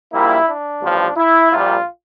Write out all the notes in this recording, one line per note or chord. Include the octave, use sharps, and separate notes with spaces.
A#1 A#2 G3 A#3 E4
D4
A1 G2 F3
E4
A#1 A#2 G3 F4